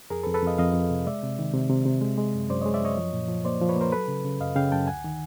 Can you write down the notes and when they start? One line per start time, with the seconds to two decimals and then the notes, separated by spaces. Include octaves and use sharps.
0.10 F2 G#4 A#4
0.23 A4 B4
0.26 F2
0.34 A4 B4
0.43 F2 D#5 F5
0.58 F2 D#5 F5
0.74 F2
0.90 C3
1.06 G#3 D5 E5
1.23 C3
1.39 D#3
1.54 C3
1.70 C3
1.85 C3
2.01 G#3
2.18 G#3
2.34 F#2
2.50 F#2 C5 D5
2.62 G#3 C#5 D#5
2.74 D5 E5
2.81 F#2 C#5 D#5
2.98 F3
3.13 A#2
3.28 F3
3.45 A#3 C5 D5
3.61 F3
3.69 B4 C#5
3.76 A#3 A#4 C5
3.92 F#3 A4 B4
4.08 C#3
4.25 C#3
4.40 F#2 D#5 F5
4.56 C#3 F5 G5
4.72 F#2 G5 A5
4.87 D2 F#5 G#5
5.04 D#3